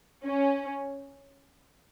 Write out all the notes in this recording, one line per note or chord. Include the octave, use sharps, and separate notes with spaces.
C#4